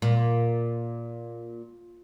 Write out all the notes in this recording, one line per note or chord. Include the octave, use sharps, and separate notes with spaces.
A#2